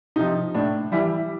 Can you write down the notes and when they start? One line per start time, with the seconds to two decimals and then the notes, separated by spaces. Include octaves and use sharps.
0.16 C3 F3 D#4
0.55 A2 D4
0.92 E3 G3 E4